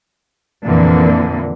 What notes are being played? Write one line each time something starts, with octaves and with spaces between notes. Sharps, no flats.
F2 A#2 D3 E3 A#3